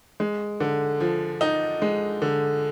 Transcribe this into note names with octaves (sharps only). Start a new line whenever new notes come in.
G#3
D3
F3
D#4
G#3
D3